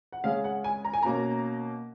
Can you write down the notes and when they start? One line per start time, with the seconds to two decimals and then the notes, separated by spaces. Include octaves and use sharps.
0.12 F#5
0.24 C#3 G#3 C#4 F5
0.44 F#5
0.64 G#5
0.85 A#5
0.94 G#5
1.03 B2 A#3 C#4 A#5